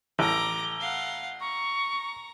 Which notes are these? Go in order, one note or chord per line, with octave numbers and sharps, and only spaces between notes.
A1 A#5 D6 G7
F5 F#5
A#5 C#6